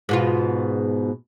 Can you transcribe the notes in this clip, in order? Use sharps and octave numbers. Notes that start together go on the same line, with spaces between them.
G#2 B2 F4